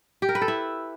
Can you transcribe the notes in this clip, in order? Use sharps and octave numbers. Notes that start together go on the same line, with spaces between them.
G4
A#4
B4
A4
E4